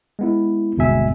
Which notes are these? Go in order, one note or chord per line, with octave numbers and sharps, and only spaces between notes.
G#3 B3 E4
G1 D#2 B2 G#3 E5 G#5